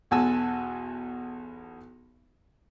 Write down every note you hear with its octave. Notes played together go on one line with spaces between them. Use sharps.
B1 E2 F#4 G#5 A5 E6